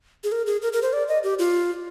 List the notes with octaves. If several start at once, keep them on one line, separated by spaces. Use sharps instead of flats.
G#4
A#4
G#4
A#4
A#4
C5
D5
D#5
G4
F4